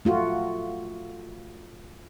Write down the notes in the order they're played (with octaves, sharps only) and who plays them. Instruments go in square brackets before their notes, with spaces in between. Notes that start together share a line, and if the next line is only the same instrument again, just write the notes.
[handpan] A3 F4 F#4